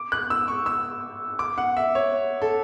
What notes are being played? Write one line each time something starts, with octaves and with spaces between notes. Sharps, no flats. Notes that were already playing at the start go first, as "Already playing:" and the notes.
Already playing: D6
F#6
E6
C#6
E6
D6
F#5
E5
C#5
A4